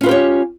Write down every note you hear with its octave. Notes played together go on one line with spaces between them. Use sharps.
C#4 F4 G4 B4 C#5